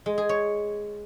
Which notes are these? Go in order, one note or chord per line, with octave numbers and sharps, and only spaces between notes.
G#3
G#4
C#5